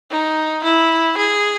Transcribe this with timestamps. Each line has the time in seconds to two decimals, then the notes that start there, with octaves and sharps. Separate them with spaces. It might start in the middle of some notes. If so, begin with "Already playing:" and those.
0.11 D#4
0.64 E4
1.17 G#4